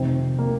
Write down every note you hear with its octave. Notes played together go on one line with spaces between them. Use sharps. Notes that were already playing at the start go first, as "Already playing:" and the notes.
Already playing: F2 C3 D#3 C4
A#3